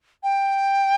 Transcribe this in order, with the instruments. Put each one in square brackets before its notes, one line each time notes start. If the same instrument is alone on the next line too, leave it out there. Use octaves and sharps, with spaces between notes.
[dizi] G5